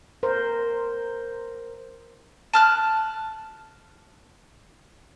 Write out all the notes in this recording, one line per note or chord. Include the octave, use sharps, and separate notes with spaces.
A#4 C5
A5 F6 F#6